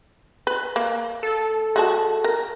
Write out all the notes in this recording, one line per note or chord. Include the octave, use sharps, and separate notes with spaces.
B4
A#3
A4
G#3 F#4 A5
A#4